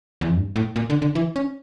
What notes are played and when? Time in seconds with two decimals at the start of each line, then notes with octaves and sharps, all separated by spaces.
0.21 E2
0.29 F2
0.37 G2
0.56 A2
0.76 A#2
0.90 D3
1.02 D3
1.15 E3
1.36 C#4